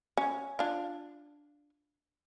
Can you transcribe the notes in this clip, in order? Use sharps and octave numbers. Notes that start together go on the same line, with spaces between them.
C#4
D4 F4